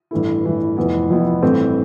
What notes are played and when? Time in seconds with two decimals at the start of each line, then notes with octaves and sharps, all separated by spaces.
0.11 A1 G2 E3 A3 E4
0.44 A1 G2 E3 A3 E4
0.77 F1 F2 E3 B3 E4
1.10 F1 F2 E3 B3 E4
1.42 A1 G2 E3 A3 C4